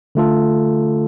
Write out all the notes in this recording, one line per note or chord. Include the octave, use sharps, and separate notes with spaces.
D3 A3 F4 A4